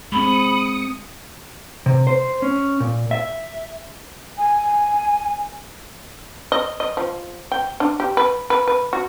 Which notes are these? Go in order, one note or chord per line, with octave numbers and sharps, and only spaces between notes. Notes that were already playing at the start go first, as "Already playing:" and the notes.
G#3 C4 B5 D#6 C#7
C3
C5
C#4
A#2
E5
G#5
D#5
D#5
F3
G5
D4
G4
B4
B4
B4
F#4